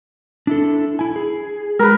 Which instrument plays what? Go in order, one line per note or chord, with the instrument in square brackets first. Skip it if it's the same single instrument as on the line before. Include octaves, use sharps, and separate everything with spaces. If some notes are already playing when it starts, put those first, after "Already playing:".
[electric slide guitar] D4 E4 A4
E4 G#5
G#4
[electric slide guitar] G#3 [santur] A#4 B4